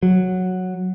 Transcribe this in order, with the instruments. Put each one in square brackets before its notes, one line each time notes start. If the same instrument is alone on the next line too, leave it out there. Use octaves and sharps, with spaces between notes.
[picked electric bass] F#3